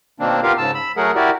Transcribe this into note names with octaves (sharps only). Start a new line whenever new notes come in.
B2 D#3 A#3 C4 D4
B3 F4 G4 A#4 F5
G#2 C#3 A5 E6
B5 E6
F#3 A3 G#4 A#4 F#5
E4 F#4 G4 A#4 D5